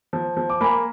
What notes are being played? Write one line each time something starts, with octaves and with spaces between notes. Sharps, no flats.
F3
F3
D6
A#3 G#5 B5